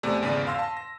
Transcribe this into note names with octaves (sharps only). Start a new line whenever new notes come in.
E2 C3 A3 D5
G#1 E2 C#3 D5 B6 D#7
F5 C6 E6 A#6
A5 C6
A#6